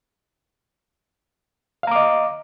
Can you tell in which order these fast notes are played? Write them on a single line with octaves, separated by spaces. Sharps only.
F5 A#5 D6 D#5